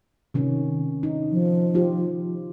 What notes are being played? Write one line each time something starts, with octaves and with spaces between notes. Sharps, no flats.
C3 D#3 C#4
D#4
F3
D#4 F4 G4